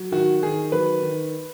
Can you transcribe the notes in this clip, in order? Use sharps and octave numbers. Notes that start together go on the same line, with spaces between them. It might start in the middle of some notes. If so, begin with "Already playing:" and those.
Already playing: F#3
D#3 F#4
D#3 G#4
F#3 B4
D#3